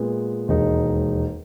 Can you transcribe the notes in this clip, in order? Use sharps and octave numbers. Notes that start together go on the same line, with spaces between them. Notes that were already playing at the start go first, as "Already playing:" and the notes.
Already playing: A#2 G#3 B3
E1 D#2 D#3 G#3 D#4